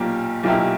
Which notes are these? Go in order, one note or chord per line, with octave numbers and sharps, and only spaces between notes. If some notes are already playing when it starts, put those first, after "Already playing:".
Already playing: B1 A#2 A#3 G4
B1 A#2 A#3 E4 G4